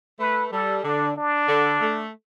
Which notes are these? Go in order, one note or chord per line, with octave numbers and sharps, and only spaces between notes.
A3 B4
G3 A4
D3 D4
D4
D3
A3